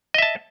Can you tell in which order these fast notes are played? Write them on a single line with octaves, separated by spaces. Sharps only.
D#5 E5 A5